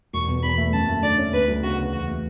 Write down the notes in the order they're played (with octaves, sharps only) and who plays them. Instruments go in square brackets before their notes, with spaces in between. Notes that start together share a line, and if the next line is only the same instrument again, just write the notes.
[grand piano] E1 [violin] C#6
[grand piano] B2
[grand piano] E2 [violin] B5
[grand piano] A3
[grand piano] F#2 [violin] A5
[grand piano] A3
[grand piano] D3 [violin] D5
[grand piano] C#4
[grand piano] D2 [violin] B4
[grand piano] F#3
[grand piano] C#3 [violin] F#4
[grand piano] B3
[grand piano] E2 [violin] F#4
[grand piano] A3